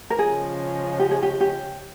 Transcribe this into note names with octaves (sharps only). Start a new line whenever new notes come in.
A#4
C#3 F3 G#3 C#4 G#4
G4
G#4
G4
G4